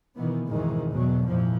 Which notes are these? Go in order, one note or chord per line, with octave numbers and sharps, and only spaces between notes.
B2 D#3 E3 B3
G#1 F2 B2 D#3 E3 G#3
E2 B2 F#3
G#1 F2 A#2 E3 F3